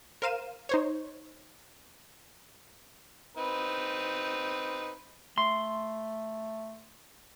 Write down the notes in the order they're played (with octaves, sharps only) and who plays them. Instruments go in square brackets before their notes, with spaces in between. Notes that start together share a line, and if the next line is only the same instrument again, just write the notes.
[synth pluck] A#4 C5 F5 D#7 E7
D#4 C5 C#5
[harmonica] C4 D#4 B4
[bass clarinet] A3 [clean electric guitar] C6